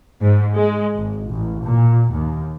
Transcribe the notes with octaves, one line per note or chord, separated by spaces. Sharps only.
G#2
G#3
G#1
A1
A#2
D#2